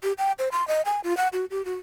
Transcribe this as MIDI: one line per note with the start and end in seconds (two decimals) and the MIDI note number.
0.03 0.13 67
0.18 0.32 79
0.39 0.49 72
0.52 0.66 84
0.68 0.82 75
0.85 1.00 80
1.04 1.16 65
1.17 1.28 78
1.33 1.45 66
1.51 1.64 67
1.65 1.75 66